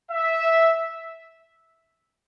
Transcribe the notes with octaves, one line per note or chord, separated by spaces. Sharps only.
E5